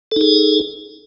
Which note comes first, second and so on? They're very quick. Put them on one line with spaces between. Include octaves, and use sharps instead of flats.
A4 D#4 G#4